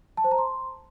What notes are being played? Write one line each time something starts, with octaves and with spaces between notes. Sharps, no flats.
A5
C5
A#5
C6